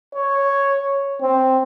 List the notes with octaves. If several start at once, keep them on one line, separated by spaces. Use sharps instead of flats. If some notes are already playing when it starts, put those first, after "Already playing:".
C#5
C4